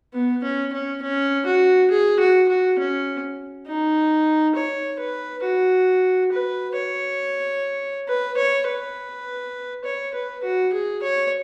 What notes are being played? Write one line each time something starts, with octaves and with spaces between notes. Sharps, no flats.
B3
C#4
C#4
C#4
F#4
G#4
F#4
F#4
C#4
D#4
C#5
B4
F#4
B4
C#5
B4
C#5
B4
C#5
B4
F#4
G#4
C#5